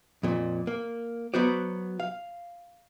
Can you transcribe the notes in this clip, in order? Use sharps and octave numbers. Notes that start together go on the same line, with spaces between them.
F2 A#2
A#3
F#3 B3 F#4 C5 D5
F5